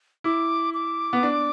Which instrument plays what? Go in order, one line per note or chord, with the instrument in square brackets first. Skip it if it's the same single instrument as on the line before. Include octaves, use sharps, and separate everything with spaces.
[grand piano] E4 [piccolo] D6
[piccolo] D6
[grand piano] B3
D4